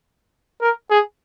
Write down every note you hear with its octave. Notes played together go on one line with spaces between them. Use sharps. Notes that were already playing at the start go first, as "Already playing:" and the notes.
A#4
G#4